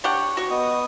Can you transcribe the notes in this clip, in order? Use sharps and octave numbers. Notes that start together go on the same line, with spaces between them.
D4 G4 C#5 F#5
F#4 C#6
B3 D#5 D#6